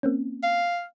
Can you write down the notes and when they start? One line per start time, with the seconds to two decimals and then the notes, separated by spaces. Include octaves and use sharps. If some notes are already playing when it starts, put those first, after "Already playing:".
0.03 A#3 C4 C#4
0.43 F5